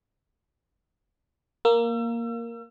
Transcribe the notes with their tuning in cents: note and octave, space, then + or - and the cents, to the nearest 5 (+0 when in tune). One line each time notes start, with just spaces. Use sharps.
A#3 +0 E6 +35